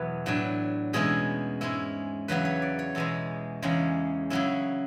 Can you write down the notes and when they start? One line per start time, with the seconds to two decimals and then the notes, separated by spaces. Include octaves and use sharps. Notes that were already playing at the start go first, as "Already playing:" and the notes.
Already playing: E2 B2 F#3 B3
0.26 A2 F#3 B3 D4
0.93 E2 B2 G#3 C#4 E4 G#4
1.61 G#2 G#3 C#4 E4
2.28 E2 C#3 F#3 B3 B4
2.45 C#5
2.62 D5
2.79 C#5
2.95 E2 B2 G#3 A4
3.62 E2 C#3 G#3 C#4
4.30 C#3 F#3 C#4 E4